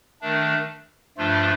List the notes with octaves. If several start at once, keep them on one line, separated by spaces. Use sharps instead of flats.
D#3 A3 D4
G2 F3 A3 D4 F4